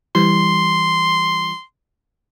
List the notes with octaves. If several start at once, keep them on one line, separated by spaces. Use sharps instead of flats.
E3 G3 C6